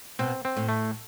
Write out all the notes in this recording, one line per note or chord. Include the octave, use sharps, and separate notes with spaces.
B2 C4
C4
A2
A3